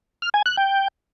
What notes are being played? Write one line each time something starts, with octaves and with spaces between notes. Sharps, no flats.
F6
G#5
F#6
G5